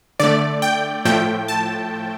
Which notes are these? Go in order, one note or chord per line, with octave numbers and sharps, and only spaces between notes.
D3 A3 D5
G5
A2 F3 A3 G5
A5